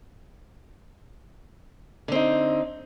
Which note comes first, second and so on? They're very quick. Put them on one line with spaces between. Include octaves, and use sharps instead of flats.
D3 C4 D#4